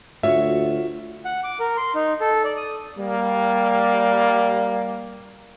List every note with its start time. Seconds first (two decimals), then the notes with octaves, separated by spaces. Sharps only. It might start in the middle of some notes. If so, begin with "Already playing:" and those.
0.23 D2 F4 F#4 C#5 E5
1.25 F#5
1.44 D6
1.60 A#4
1.77 C6
1.95 D#4
2.21 A4
2.44 D5
2.57 D#6
2.97 G3 A#3